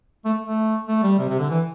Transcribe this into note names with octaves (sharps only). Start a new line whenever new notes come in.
A3
A3
A3
G3
C3
C3
D3
E3